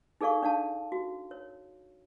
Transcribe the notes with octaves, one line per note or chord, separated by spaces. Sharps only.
D#4 G#4 A4 D5 F5 C#6
D4 D5 F5 A5
F#4
C#5